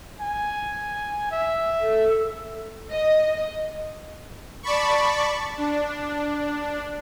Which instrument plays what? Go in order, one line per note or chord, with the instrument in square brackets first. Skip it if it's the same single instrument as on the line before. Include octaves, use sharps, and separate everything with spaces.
[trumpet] G#5
E5
[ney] A4
[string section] D#5
[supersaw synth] D5 A5 B5 C#6
D4